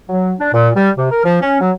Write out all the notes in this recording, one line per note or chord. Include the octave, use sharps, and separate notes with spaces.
F#3
D4
A#2
G3
C3
A#4
F3
C#4
F#3